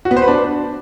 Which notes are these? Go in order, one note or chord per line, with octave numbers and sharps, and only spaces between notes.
F#4
B3
C5
B4
D4